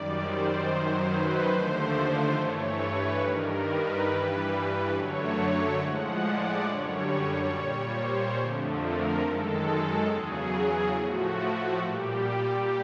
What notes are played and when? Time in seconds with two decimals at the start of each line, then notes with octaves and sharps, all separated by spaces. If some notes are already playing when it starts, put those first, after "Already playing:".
Already playing: F#2 D#3 G3 D5
0.21 C5
0.64 F#2 D#3 F#3
1.07 B4
1.49 D#2 D3 F3 A3 C5
2.35 G2 E3 A3 C#5
2.78 B4
3.21 G2 D#3 G3 A#4
3.64 B4
4.06 G2 E3 G3
4.92 F#2 D3 F#3 A3 C#5
5.78 A2 F3 G#3 F#5
6.21 D5
6.64 F#2 D3 G3 C#5
7.49 A#2 G3
7.93 C5
8.36 F2 D3 F3 A3
8.78 A#4
9.21 F#2 D#3 G#3 A4
10.07 E2 C#3 F#3 G#4
10.93 A2 F3 A3 F#4
11.79 A#2 G3 G4